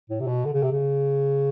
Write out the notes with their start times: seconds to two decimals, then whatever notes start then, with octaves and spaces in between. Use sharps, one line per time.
0.10 A2
0.20 C3
0.27 B2
0.45 D3
0.53 C#3
0.63 C3
0.72 C#3